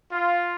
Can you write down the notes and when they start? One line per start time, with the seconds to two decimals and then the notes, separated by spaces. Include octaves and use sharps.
0.12 F4